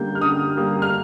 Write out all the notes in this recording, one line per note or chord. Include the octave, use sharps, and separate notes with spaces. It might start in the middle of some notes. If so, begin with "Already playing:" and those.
Already playing: D3 G3 A#3 G6
F6
D3 D#6
G3 A#3
F6